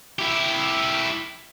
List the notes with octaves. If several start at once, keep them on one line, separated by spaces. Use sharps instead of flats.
E4 G4